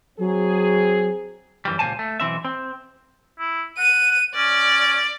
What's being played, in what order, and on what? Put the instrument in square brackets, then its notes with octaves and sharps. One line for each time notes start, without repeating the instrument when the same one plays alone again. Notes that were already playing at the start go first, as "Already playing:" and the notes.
[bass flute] F#3 [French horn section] C4 G#4
[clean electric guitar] F#2 E3 G3
C#2 A#2 D#3 C5 G#5 A5
A3
B1 E3 C4 E5
C4
[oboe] E4
[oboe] F#5 [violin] D#7
[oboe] C#4 [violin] D5